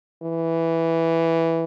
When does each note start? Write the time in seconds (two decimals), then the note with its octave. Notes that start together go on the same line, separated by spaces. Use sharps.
0.22 E3